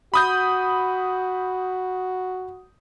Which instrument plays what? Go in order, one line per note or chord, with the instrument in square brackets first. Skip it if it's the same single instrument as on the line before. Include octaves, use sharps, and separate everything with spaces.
[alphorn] F#4 [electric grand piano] B5 D#6 G6